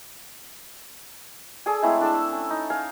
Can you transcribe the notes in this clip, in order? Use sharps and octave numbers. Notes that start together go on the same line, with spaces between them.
G#4 A4 D5 G#5
G#3 A3 C4 E4
D4 A4 E6
C#4
D#4
F5 G#5